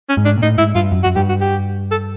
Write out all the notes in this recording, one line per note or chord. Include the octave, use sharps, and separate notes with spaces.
C#4
G#2
D4
A#2
A2 D#4
G#2 E4
G2 F4
F#2
F#2 F#4
G2 G4
F#4
G4
A4